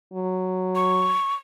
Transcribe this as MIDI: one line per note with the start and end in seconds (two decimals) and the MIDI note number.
0.13 1.15 54
0.75 1.35 85